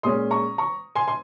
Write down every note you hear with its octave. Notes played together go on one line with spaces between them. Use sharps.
A#2 G#3 C#4 C6 D#6
A#5 C#6
A#5 C#6
G#5 C6
C6